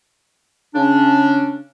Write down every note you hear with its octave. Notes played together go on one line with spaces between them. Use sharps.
C#3 C#4 D4